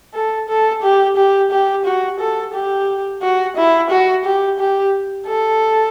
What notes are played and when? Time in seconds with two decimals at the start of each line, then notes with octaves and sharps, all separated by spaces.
0.14 A4
0.49 A4
0.83 G4
1.17 G4
1.51 G4
1.85 F#4
2.20 A4
2.54 G4
3.22 F#4
3.57 E4
3.91 F#4
4.25 G4
4.59 G4
5.28 A4